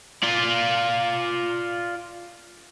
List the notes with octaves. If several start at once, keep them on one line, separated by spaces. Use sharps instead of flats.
F4 D5